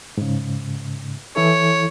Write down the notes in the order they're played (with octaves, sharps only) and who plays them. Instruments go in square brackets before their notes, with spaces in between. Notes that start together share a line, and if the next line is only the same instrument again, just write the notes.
[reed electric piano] G#2 C#3
[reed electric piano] E3 E4 A4 [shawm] C#5